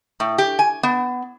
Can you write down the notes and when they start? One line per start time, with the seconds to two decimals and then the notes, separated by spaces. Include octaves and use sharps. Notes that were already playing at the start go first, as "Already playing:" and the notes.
0.20 A2
0.38 G4
0.59 G#5
0.83 B3